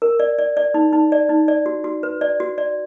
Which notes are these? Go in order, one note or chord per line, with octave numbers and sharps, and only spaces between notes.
A#4
D5
D5
D5
D#4
D#4
D5
D#4
D5
F#4
F#4
B4
D5
F#4
D5